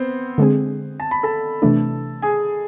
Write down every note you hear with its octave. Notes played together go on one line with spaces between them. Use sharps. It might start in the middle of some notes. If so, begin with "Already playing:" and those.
Already playing: B3 C4 C5
D3 G#3 C4 G#4
A5
B5
A4 A5
C3 E3 A3 D4
G#4 G#5